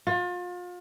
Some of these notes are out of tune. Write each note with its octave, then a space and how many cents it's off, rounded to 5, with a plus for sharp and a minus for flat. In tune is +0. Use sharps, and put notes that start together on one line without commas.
F4 +35